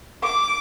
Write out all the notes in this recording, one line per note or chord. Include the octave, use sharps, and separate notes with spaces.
D6